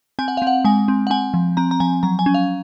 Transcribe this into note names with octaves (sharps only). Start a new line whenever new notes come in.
C4 G#5
F#5
F5
C4
F#5
G#3 G#5
C4
F#5
C4 G#5
F3
C4 A#5
A#5
F3 G#5
F#3 A#5
G#5
C#4
F5